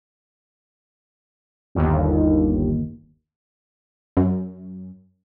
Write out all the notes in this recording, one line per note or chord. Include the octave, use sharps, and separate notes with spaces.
G1 D#2
F#2